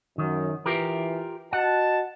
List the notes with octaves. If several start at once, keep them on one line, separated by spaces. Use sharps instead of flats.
F#2 D#3
E3 F4 G4 A#4
F#4 D#5 F#5 A5